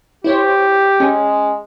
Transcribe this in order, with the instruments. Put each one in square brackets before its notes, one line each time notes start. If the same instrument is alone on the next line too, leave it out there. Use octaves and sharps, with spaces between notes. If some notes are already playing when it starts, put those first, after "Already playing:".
[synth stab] E4 C5 C#5 [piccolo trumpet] G4
[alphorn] G#3 [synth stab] C#4